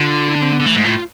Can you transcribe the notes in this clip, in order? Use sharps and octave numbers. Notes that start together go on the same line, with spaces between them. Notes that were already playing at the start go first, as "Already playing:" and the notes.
Already playing: D3 F4
E4
D4
C4
B3
D3
E3 A3
G#2
A2 F4